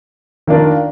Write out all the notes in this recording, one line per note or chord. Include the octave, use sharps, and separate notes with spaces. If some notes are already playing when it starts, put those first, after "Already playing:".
D#3 A#3 D4 F4 A#4